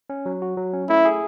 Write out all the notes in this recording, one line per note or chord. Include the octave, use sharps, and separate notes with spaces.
C#4
F#3
F#4
F#3
C#4
A3 E4
G#4